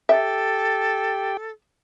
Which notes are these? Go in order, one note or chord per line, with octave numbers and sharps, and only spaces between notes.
G4 A4 E5 G5